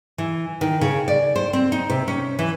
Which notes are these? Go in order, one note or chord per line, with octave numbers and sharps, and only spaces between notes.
E3
D#3
C#3
D5
C5
C4
D#4
C3
C#4
E3